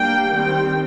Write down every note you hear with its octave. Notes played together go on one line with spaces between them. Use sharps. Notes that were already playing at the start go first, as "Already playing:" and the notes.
Already playing: G3 A#3 D4 G5
D#3 G3 C4 G5